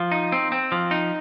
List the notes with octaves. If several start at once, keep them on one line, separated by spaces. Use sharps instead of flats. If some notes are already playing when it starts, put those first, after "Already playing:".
Already playing: F3
D#4
C4
C4
F3
D#4